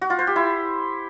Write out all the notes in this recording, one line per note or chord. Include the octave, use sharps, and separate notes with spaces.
F#4
F4
C5
G4
E4